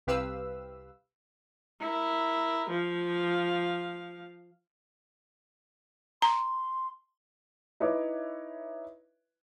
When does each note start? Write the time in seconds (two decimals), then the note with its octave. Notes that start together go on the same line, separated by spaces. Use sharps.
0.07 C2 C3 G4 B4 F5 E6
1.81 E4 A#4
2.70 F3 F5
6.22 A#5 C6
7.80 D#4 E4 B4 C#5 E5 D6